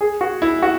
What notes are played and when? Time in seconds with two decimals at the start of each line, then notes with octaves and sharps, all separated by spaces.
0.01 G#4
0.21 F#4
0.42 E4
0.62 F#4